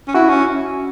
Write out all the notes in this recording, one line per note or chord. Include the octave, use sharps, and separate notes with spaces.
C#4
E4 F#4
C#4